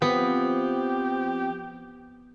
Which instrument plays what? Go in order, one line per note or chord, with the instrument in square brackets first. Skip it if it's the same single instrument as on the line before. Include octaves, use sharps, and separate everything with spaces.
[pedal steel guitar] F3 C4 [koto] B3 [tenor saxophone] G4